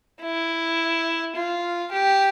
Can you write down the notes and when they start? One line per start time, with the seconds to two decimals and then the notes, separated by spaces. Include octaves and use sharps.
0.23 E4
1.36 F4
1.92 G4